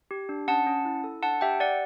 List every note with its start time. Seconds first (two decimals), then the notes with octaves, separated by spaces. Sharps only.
0.11 G4
0.29 D4
0.48 C#4 F#5 A5
0.67 C#4
0.85 E4
1.04 A4
1.23 D4 F#5 A5
1.41 G4 E5 G5
1.60 G4 D5 F#5